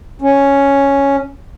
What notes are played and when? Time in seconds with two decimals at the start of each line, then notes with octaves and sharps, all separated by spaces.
0.22 C#4